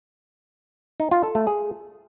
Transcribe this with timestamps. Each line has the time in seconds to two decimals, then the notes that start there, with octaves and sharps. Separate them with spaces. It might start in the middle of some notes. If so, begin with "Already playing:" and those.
1.00 D#4
1.11 F4
1.23 A4
1.35 A3
1.47 G#4